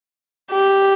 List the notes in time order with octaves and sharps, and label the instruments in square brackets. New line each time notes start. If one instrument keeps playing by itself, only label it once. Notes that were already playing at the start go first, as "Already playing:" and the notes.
[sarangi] G4